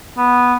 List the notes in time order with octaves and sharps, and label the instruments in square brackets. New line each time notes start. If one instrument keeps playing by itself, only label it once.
[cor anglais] B3